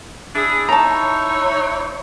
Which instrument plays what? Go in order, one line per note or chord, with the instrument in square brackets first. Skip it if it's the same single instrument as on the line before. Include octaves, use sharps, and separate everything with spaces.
[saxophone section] D4 E4 G#4
[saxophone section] D#4 E4 C#5 [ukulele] A5 A#5